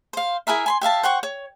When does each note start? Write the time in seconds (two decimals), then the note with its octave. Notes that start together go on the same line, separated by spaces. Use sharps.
0.13 C5 F5
0.47 E4 G#4 A#4 E5
0.66 G#5 B5 C6
0.81 G4 E5 F5 A5
1.03 C5 F#5 G5 C#6
1.23 C#5